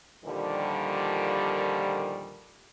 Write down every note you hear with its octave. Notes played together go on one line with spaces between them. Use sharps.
A#2 D3 D#3 F3 G3